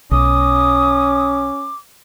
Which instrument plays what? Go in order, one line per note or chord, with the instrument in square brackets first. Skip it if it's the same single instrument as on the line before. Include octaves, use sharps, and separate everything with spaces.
[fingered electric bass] B1 [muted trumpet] C#4 [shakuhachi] D6 [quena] D#6